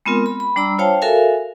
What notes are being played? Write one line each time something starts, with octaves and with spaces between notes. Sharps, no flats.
G#3 B3 C4 F4 A#4
B5
B5
G3 D4 D5 A#5 B5 E6
F4 C5 C#5 F5 G5 A5
F#4 A4 A#4 E5 F5 G#5